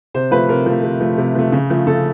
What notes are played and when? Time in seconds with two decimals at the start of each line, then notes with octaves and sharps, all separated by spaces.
0.14 C3 C5
0.31 F3 A3 B4
0.49 C3 A#4
0.66 F3 A3
0.83 C3
1.01 F3 A3
1.18 C3
1.35 F3 A3
1.52 C#3
1.70 F3 A3
1.87 C#3 A4